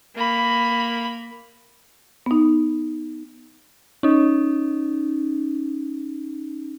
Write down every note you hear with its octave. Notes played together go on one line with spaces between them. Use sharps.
A#3 B5
B3 D#4
C#4 D#4